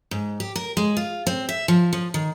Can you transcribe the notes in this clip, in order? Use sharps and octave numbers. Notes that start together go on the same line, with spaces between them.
G#2
G4
A#4
G#3
F4
C4
E5
F3
F3
D#3